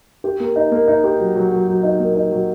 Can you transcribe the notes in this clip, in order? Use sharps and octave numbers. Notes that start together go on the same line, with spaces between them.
G4
A#3
D#4
A#3
D#4
G4
F#3
F#3
F#3
F#3
D#4
A#3
D#4
F#3